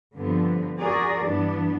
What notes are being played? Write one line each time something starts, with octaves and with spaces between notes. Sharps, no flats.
G2 D3 F3 B3 C4
F#4 G#4 A#4 D5
G2 E3 B3 D4